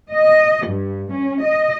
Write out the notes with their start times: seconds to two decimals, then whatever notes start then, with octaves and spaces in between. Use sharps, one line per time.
0.11 D#5
0.66 G2
1.12 C#4
1.42 D#5